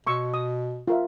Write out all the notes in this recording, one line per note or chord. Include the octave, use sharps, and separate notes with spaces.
B2 C6 C#6 E6
D#6
F4 A#4 E5